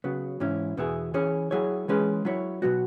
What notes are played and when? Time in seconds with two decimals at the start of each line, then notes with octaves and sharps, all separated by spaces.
0.04 C#3 F#3 B3
0.40 G#2 E3 C#4 E4
0.77 E2 B2 B3 E4 G#4
1.14 E3 C#4 G#4 C#5
1.51 F#3 E4 G#4 C#5
1.88 E3 G#3 C#4 G#4 B4
2.25 F#3 E4 C#5
2.62 B2 F#3 B3 F#4